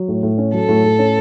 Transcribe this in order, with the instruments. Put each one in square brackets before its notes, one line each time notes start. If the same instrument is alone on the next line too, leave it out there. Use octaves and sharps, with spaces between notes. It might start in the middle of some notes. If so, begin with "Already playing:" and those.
Already playing: [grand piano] F#3
A2
A2
C#4
[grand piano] F#3 [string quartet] A4
[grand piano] A2
A2
C#4